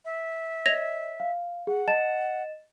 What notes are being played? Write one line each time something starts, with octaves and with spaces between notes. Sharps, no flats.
E5
C#5 D#5 G#6 A#6 F7
F5
G#4 F#5
D#5 A5 A6 E7